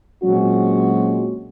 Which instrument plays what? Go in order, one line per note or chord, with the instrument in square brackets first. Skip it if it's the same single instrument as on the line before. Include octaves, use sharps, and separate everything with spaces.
[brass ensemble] A#2 F#3 G#3 C4 C#4 F#4